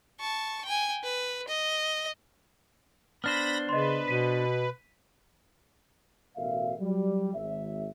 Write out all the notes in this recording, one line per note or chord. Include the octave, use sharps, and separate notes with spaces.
A5 C#6
G5 G#5
B4
D#5
B3 D4 C5 B5 F6 A#6
C#3 B4 D#5 C6
B2 B6 D#7
A1 B2 F#4 A#4 E5 F5
F#3 G3
G#1 E5